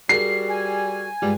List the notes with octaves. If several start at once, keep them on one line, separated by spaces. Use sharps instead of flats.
G3 F#4 G#4 A#4 C7
G#5
G2 G3 G#3 F4